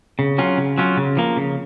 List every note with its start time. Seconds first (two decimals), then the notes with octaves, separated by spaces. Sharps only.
0.19 C#3
0.38 F#3 C#4 F4
0.57 C#3
0.78 F#3 C#4 F4
0.97 C#3
1.17 F3 A#3
1.37 C#3